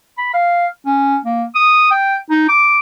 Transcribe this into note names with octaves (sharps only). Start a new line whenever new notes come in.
B5
F5
C#4
A#3
D#6
G5
D#4
D6